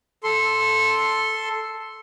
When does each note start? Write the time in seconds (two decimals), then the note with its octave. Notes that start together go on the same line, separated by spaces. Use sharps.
0.24 A4 C6